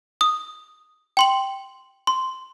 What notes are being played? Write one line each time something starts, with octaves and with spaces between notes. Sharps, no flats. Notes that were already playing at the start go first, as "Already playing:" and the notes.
D#6
G5 C6 F#7
C6